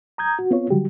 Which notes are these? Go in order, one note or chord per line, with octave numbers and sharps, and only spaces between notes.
A#5 D#6 G6 G#6
F#4
B3 C4 F4 C#5
D3 F#3 G3 F#4 G4